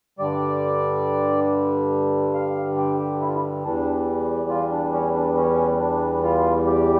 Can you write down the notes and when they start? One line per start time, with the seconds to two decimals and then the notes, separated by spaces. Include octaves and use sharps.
0.19 G2 D3 G3 D5
2.34 F5
2.77 G4
2.99 G4
3.21 E4
3.28 F4
3.34 E4
3.64 E2 E3 G3 D4
4.49 F4
4.71 D4
4.93 C#4
5.15 D4
5.36 C#4
5.79 D4
6.23 F4
6.66 G4